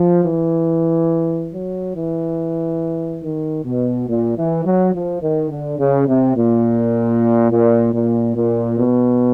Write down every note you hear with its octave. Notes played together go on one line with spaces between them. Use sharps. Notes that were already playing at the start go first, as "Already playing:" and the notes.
Already playing: F3
E3
F#3
E3
D#3
B2
A#2
E3
F#3
F3
D#3
D3
C#3
C3
A#2
A#2
A#2
A#2
B2